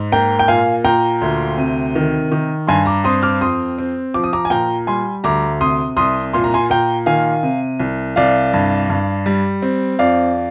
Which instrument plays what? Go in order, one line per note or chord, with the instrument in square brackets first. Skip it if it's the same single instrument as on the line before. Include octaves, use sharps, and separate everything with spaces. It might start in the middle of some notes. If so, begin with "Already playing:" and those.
Already playing: [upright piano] G#2
A#3 G5 A#5
G5
A#2 F5 G#5
A#2 G5 A#5
D2
C3
D#3
D#3
G2 G#5 C6
A#5 D6
C4 C6 D#6
D6 F6
F2 C6 D#6
C4
F3 D6
D#6
A#5 D6
G#5
A#2 G5 A#5
G3 G#5 C6
D2 A#5 D6
C3 C6 D#6
C2 C6 D#6
A#2 C6
A#5
G#5 C6
A#2 G5 A#5
D#3 F5 G#5
C3
C2
C2 D5 F5
G2
G2
G3
C4
F2 D5 F5